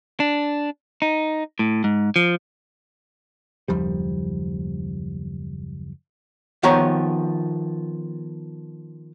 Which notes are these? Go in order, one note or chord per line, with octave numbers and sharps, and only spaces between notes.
D4
D#4
A2
G#2
F3
F#1 D#2 F3 G3
D#3 F3 B3 G4 C#5 A#5